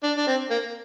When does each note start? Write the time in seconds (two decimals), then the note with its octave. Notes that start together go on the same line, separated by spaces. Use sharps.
0.03 D4
0.17 D4
0.27 C4
0.51 A#3